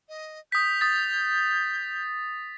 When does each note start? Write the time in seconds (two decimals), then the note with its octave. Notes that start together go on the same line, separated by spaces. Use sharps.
0.09 D#5
0.52 D#6 G6 B6
0.81 D#6 A6